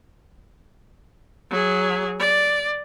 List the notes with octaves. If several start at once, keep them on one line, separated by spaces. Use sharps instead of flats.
F#3 G#4
D5